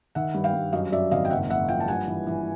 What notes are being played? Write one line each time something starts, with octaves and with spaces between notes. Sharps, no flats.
D#3 E5 F#5
G2
F5 G5
G2
F#2 D#5 F5
F#2 D5 E5
G#1 D#5 F5
G5
F#1 E5 F#5
F#1 E5 F#5
F3 F5 G5
A5
G2 F#5 G#5
E3
E3